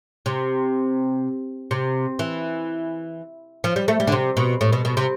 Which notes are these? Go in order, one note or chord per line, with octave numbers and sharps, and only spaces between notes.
C3
C3
E3
F3
G3
A3
G3
D3
C3
B2
A2
B2
B2
C3